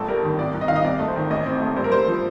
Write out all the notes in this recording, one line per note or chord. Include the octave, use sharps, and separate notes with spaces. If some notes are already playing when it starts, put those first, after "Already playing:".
Already playing: G1 A3 A4
G3 A#4
D#3
C2 D5
C2
D#5
D#3 F5
D#5
C2 D5
A3
C5
D#3
A1 D#5
C4
A3
G2 C5
A#4
G2 C5
F3